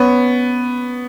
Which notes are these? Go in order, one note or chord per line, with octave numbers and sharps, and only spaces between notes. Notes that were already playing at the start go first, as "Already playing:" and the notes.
Already playing: B3 C#4